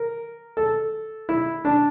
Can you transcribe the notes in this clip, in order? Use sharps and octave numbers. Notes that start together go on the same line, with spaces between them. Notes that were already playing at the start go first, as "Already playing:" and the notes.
Already playing: A#4
A4
E4
D4